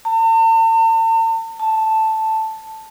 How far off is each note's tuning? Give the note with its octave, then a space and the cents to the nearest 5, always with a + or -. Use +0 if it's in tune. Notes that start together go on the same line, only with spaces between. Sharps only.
A5 +45
A5 +0